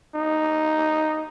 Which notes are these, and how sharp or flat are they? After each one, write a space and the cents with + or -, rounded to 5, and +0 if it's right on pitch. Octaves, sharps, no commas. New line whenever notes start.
D#4 -5